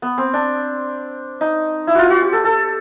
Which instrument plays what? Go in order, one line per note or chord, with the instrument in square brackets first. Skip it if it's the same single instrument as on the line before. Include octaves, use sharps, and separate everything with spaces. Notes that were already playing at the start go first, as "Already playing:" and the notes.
[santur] B3
C4
D4
D#4
E4
F4 F#4
F#4
G4
A4
A4